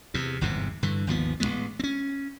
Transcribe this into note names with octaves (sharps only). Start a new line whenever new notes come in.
E2 C3
G1 E2 G#2 C3
G2 D3 E3
G#1 D#2 F3 B3
A1 E3 G#3 B3
C4 C#4